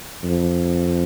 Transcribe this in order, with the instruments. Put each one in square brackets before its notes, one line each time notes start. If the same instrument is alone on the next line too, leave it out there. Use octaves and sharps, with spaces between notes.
[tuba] F2